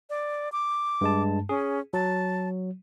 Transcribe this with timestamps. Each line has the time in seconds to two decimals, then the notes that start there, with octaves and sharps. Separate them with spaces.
0.10 D5
0.52 D6
1.01 G2 G#3 A5
1.49 C#4 G#4
1.93 F#3 A5